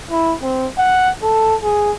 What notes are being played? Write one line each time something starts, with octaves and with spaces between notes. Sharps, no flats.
E4
C4
F#5
A4
G#4